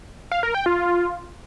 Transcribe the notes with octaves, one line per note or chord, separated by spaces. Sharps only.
F5
A#4
G5
F4